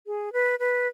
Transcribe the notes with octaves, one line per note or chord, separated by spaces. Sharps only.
G#4
B4
B4